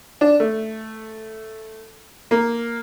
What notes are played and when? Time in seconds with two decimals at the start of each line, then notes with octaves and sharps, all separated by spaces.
0.21 D4
0.40 A3
2.31 A#3